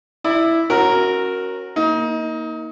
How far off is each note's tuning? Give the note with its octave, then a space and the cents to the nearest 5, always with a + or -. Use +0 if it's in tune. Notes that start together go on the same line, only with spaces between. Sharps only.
E4 +0 D5 +30
C#4 -25 F#4 +0 A#4 +0
A#3 +0 D#4 +30